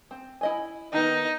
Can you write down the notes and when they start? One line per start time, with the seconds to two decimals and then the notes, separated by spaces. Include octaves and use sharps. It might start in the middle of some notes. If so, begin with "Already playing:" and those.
0.11 C4
0.41 E4 D#5 G#5
0.93 D#3 B3 D#4